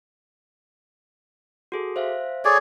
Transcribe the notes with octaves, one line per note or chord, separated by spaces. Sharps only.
F#4 G#4 A4
C5 E5 F5
G#4 A4 C#5 D5 D6